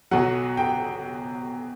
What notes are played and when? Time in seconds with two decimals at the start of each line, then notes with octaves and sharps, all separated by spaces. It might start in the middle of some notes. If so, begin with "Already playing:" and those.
0.11 B1 B2 F#3 F#5
0.57 G5